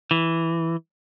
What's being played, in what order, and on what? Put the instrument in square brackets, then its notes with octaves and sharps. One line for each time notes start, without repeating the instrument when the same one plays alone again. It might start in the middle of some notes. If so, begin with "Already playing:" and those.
[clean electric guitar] E3